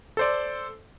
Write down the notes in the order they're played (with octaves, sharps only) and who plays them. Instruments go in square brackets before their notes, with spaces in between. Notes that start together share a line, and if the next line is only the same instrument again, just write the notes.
[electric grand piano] A4 C5 D5